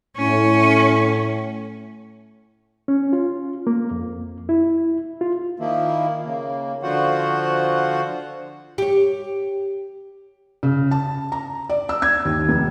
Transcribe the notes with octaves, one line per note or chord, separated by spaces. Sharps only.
A2 C#4
C#4
F4
A#3
F2
E4
F4
D#3 F3 A#3 E4
C#3 A#3
D3 F3 F4 F#4 C5 F#5
G4 C#5
C#3
A5
A#5
D5
E6
G#6
D#2
F1